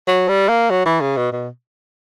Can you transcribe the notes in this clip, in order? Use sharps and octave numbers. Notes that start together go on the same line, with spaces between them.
F#3
G3
A#3
F#3
E3
C#3
B2
B2